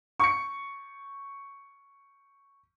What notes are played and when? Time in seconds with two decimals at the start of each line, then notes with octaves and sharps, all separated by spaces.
0.20 C#6 C#7